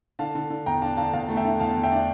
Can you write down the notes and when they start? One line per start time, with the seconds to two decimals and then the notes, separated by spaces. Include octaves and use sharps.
0.19 D3 F5 A5
0.35 D3
0.50 D3
0.66 E2 G5 A#5
0.82 D4 F5 A5
0.97 D3 F5 A5
1.13 E2 F5 A5
1.29 A3 A5
1.37 E5 G5
1.45 D3
1.60 E2 F5 A5
1.76 E2
1.83 E5 G5
1.92 D4